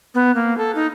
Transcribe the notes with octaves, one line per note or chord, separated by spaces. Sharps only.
B3
A#3
A4
D#4